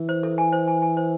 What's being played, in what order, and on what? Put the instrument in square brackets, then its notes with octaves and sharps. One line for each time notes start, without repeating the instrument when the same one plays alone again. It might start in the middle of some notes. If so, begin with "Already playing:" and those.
Already playing: [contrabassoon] E3
[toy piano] C5
A4
G#5
C5
G#5
G#5
C5